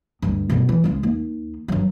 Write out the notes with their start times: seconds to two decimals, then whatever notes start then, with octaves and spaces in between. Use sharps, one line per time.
0.22 D2 G2
0.50 G2 B2
0.69 E3
0.84 C#2 G#3
1.03 D#2
1.68 G2 F#3